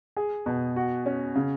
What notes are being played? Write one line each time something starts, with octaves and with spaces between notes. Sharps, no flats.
G#4
B2
F#4
C#4
C#3